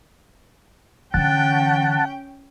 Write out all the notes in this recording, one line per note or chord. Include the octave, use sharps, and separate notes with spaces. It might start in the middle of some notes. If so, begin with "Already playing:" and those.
D3 E3 C#4 F#5 G5 A5